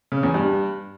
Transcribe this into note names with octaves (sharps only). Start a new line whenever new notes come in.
C#3
E2
G2